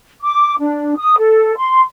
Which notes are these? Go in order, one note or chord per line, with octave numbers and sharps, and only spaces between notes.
D6
D4
D#6
A4
C6